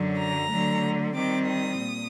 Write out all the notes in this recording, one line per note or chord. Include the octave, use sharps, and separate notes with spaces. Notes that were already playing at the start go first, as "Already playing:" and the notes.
Already playing: F#2 D3 F#3
A#5
D3 F#3 A3
D#3 G3 C4 D6
D#6
A#2